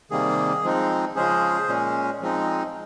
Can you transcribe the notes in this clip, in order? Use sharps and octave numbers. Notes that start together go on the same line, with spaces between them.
C3 D#3 G3 A#3 G#4
F3 G#3 C4 D#4
C#3 F3 G#3 C#4 G#4 C5
A#2 G#3 C#4
F3 G#3 C4 D#4